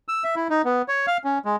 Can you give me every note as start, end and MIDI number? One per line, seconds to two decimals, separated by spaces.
0.08 0.24 88
0.24 0.35 76
0.36 0.48 64
0.50 0.62 63
0.65 0.82 59
0.88 1.06 73
1.07 1.17 77
1.24 1.39 61
1.45 1.56 56